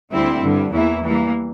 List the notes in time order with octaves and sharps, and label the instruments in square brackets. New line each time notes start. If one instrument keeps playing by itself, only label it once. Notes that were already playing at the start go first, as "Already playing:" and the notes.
[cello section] D2 D3 G3 C4 E4
G2 D3 G3
E2 E3 A#3 E4
E3 G3 A#3